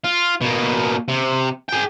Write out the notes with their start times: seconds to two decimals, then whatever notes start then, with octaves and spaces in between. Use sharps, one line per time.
0.04 F4
0.41 B2 A#3
1.08 C3
1.69 G#4 G5